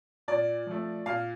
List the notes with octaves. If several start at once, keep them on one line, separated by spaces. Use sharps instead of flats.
A#2 D5
F3 A3
A#2 F5